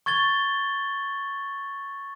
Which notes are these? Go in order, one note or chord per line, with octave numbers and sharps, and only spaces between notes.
C#6 G#6 A6 G7